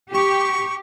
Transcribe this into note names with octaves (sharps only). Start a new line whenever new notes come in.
G4 C#6